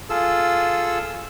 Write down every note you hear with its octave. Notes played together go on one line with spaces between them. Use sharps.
F4 G#4 A4 E6